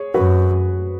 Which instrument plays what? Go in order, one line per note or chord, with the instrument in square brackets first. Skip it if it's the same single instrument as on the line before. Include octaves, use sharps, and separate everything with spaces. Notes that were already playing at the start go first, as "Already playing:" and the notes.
Already playing: [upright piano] G#4 C#5
[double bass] F#2 [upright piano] F#4 B4